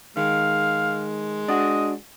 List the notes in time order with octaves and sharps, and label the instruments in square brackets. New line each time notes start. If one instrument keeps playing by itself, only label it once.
[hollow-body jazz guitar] D#3 [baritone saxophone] G#3 [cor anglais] F5
[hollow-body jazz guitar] D4 F#4 [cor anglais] D#5